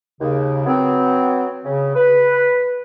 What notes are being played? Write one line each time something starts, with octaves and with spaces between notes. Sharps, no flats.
D#2 C#3
F#3 B3 C4
C#3
B4